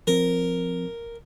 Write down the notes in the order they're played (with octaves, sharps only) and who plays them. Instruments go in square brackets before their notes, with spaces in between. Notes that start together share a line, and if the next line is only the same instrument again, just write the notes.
[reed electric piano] F3 C4 [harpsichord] A#4